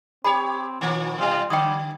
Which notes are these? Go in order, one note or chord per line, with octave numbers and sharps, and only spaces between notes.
C4 G4 C#5 B5
B2 D#3 F3 A#3
B2 G3 F4
D3 G3 G5 D#6